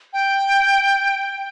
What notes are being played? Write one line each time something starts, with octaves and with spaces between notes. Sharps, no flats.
G5